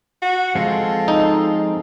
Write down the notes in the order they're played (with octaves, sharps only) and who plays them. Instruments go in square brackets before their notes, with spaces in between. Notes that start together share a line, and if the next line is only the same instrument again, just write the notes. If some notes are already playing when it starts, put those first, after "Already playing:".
[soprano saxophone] F#4
[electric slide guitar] F3 G#3 C4 [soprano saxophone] F4 [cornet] A4
[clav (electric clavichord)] D#4